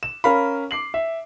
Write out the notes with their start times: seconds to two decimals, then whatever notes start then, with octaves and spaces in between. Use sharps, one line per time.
0.03 E7
0.24 C#4 A#4 F5 B5
0.71 D6 C7 F#7
0.94 E5